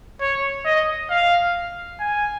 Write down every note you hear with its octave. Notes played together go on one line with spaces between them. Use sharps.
C#5
D#5
F5
G#5